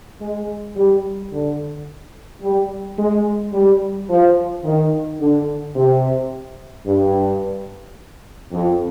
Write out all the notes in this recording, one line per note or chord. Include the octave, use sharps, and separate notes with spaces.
G#3
G3
D3
G3
G#3
G3
F3
D#3
D3
C3
G2
F2